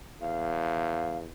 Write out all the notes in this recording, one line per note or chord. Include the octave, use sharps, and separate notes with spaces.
E2 F5